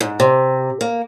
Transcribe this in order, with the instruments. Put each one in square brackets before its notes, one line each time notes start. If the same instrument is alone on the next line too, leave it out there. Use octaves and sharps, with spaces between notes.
[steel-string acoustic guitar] G#2
C3
A#3